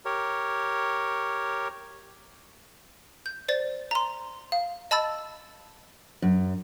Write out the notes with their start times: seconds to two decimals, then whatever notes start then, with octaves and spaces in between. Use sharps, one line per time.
0.05 G4 A#4 C#5
3.26 G6
3.49 C5 D5 A6
3.91 A#5 C6
4.52 F5
4.91 D#5 A5 B5 E6 A6
6.22 F#2